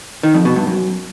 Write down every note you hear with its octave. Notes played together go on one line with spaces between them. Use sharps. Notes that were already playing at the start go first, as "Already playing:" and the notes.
D#3
F2
B2
G2
F#2